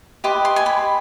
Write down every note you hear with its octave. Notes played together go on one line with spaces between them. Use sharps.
G4 B4 D#5 C6
C6
G#5
B5